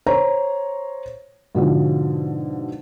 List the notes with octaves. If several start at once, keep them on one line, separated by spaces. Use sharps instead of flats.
C5 C#5 A#5
G#2 B2 D3 F3